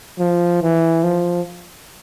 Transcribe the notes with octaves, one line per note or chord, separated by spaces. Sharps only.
F3
E3
F3